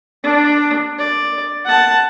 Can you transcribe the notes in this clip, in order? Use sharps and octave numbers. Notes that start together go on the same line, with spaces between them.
D4
D5
F#5 A5